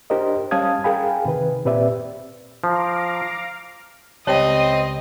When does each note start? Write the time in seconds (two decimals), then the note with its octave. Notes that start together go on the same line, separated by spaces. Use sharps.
0.10 D4 G4 A#4 C5 D#5
0.51 G3 C#4 F5 A5 D#6 G#6
0.84 G#4 A#4 F5 G5 G#5 B5
1.25 C3 D#3 B4
1.65 A#2 C4 G4 B4 D5 E5
2.64 F3 F5 A#5 D6
4.27 C#2 G3 C4 C#5 D#5 G5 A5